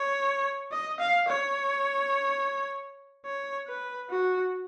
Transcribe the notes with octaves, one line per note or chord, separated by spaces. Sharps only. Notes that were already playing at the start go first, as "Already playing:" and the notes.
Already playing: C#5
D#5
F5
C#5
C#5
B4
F#4